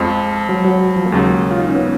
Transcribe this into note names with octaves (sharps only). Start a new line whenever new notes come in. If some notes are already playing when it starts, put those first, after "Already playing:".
Already playing: F2 F3 G#3
F#3
F#3
F3
A#3
D#2 C#3 F#3 G#3
F4
D#4
C#4
B3